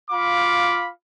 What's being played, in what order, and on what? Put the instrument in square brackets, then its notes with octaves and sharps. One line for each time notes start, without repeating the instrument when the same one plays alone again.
[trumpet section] F4 F5 B5 D6